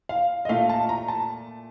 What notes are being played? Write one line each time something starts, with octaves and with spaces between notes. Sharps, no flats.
F5
D#5
A#2 A3 F5
A5
A#5
A5